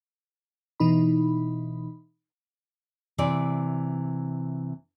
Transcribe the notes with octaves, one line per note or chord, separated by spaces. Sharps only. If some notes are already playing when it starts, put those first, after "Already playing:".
B2 E3 D#4 B5
C3 E3 D5